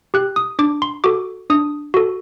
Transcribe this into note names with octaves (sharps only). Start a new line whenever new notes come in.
G4 F#6
D#6
D4 D6
C6
F#4 A4 D6
D4 D#6
F#4 A4